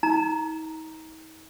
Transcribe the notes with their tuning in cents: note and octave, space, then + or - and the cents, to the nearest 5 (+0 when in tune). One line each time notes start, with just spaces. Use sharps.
D#4 +40 A#5 +0